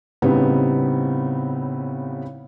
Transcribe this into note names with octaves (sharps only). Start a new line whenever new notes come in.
A2 C#3 G3 B3 C4 D#4